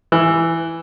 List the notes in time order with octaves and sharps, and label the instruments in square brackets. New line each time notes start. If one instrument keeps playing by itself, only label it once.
[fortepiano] E3